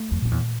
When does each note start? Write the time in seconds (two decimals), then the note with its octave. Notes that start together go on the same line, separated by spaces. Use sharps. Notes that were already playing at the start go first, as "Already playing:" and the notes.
Already playing: A3
0.11 F2
0.22 F2 A#2
0.31 E2